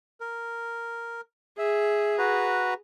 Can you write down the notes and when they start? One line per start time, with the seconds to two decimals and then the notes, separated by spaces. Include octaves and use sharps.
0.21 A#4
1.58 G#4 E5
2.18 F#4 B4 A#5